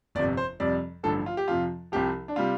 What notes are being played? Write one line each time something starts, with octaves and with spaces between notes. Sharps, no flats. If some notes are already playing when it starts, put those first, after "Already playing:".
G1 F2 C3 D5
C5
F2 C3 G3 D5
A1 G2 D3 F3 A4
F4
G4
F2 C3 F3 F4
C2 C3 F3 G4
D4
C3 G3 F4